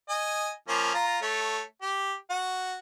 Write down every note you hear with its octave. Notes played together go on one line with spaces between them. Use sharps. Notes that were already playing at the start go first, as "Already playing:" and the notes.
D#5 G#5
F3 A#3 C#4
F4 A#5
A3 C#5
G4
F#4